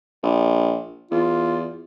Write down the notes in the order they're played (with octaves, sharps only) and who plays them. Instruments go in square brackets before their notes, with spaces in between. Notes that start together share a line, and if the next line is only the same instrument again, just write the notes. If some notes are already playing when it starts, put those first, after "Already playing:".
[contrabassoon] A#1
[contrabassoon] E2 [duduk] F4